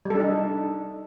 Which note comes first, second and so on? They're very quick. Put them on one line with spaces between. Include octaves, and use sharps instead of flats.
G3 A4 D4 D#4